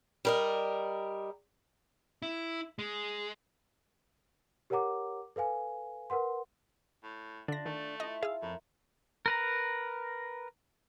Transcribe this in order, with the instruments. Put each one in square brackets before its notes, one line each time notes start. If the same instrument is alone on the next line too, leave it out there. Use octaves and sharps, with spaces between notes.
[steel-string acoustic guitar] G3 A#4 D#5
[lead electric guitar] E4
G#3
[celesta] G4 A#4 C#5 F#5 A#5 D6
A4 B4 F5 G#5
A#4 B4 F#5 C6
[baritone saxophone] A2
[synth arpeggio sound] D3 A#6 [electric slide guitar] D4 [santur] F4
[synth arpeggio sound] D#3 [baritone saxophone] A3
[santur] E4 F4 A5 [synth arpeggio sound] D#5
[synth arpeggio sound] G#4 E6 [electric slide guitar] F5
[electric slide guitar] F2 [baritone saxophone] A2 [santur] A#4
[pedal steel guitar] A#4 B4 A#5